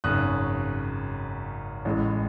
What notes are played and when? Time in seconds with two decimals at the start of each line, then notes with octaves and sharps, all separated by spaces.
0.04 G#1 F#2 C#3 D#6 F#6
1.85 A1 A2 G#3